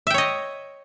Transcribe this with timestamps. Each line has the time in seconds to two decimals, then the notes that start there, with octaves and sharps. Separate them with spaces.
0.07 E5
0.10 G5
0.14 C#5
0.18 D#5